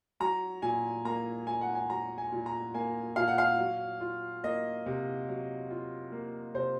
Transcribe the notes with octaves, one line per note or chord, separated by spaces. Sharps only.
F#3 A#5
A#2 G#5
A#3 A#5
A#2 G#5
F#5
G#5
F#3 A#5
G#5
A#2
A#5
A#3 G#5
A#2 F5
F#5
F5
F#3
F4
A#3 D#5
C3
F#3
F4
A#3
C3 C5